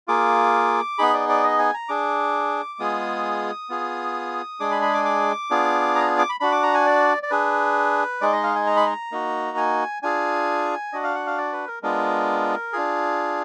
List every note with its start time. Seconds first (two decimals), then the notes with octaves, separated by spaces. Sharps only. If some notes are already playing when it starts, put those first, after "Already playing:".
0.08 A#3 F4 G#4 D6
0.98 B3 D#4 G#4 B5
1.14 D5
1.29 D5
1.44 D#5
1.59 G#5
1.74 A#5
1.89 D4 G#4 D6
2.79 G#3 B3 F4 G#4 D#6
3.70 B3 F4 G#4
4.60 G#3 D4 G#4 D6
4.71 B5
4.82 B5
4.94 D6
5.05 D6
5.50 B3 D4 F4 G#4
5.95 A#5
6.19 D6
6.29 B5
6.40 D4 F#4 B5
6.52 D6
6.63 A#5
6.74 G#5
6.86 D5
7.23 D5
7.31 D4 G#4 B4
8.21 G#3 D#4 G#4 D5
8.33 D#5
8.43 F5
8.55 G#5
8.66 A#5
8.76 B5
8.87 A#5
9.12 A#3 D#4 F#4
9.57 G#5
10.03 D4 F4 G#4 G#5
10.93 D4 F#4 D#5
11.04 F5
11.15 F#5
11.27 F5
11.38 D5
11.52 B4
11.67 A#4
11.83 G#3 B3 D4 F4 A#4
12.73 D4 F4 G#4